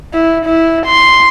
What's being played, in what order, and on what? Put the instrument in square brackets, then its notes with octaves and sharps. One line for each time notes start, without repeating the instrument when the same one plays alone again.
[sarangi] E4
E4
C6